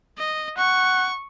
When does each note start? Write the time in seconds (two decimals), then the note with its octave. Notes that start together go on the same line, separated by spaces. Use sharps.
0.18 D#5
0.58 F#5 C#6